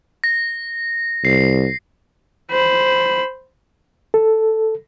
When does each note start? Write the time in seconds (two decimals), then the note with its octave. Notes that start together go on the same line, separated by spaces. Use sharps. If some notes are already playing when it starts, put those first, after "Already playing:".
0.24 A#6
1.25 C2 C7
2.51 C5 B5
4.14 A4